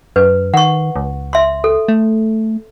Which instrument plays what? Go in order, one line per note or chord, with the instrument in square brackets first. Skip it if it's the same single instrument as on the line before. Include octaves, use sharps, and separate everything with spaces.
[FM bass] F#2 [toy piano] B4
[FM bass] D#3 [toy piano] F#5 C#6
[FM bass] C#2
[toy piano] E5 C6
A4
[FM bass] A3